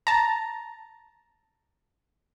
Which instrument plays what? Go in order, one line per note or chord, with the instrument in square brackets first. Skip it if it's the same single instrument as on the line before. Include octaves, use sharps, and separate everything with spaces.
[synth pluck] A5 A#5